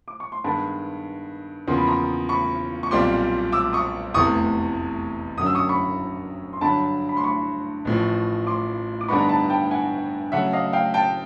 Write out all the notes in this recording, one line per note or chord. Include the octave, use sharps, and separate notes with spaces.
D6
C#6
C6
G2 D#3 G#3 B3 A5 B5
E2 C#3 F3 A#3 C6
B5
A#5 C6
B5 C#6
C#6
B1 A#2 G3 C4 F4 C6 D6
D6 E6
C#6 D#6
F1 E2 C3 E3 A3 C#6 D#6
F#2 D3 F#3 A#3 C#4 D#6
E6
C#6 D#6
B5 C#6
C6
G2 D3 F#3 A5 B5
B5
C6
B5 C#6
A1 A2 F3
C6 D6
D6
G2 D3 G3 B3 D#4 B5 C#6
A#5
A5 B5
G5 A5
F#5 G#5
C#3 F#3 A3 E5 F#5
D#5 F5
F5 G5
G5 A5